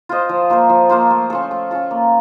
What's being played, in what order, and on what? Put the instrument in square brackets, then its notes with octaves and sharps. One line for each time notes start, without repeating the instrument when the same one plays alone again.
[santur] F4 C5 D#5
F3
A#3 F4 C5
F3
A#3 F4 C5
A3
C#4 F4 A4
A3
C#4 F4 A4
A#3